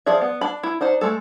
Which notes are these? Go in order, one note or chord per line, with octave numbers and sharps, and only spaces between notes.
F3 G#4 D5 E5
B3
D4 B5
E4
D4 D#4 C5
G#3 A3 A4